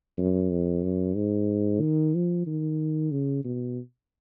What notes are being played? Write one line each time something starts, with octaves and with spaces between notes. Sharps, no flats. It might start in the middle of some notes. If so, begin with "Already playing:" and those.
F#2
F2
F#2
G#2
D#3
F3
D#3
C#3
B2